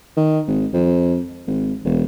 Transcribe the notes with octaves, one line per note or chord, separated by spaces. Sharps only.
D#3
G#1
F2
G#1
E1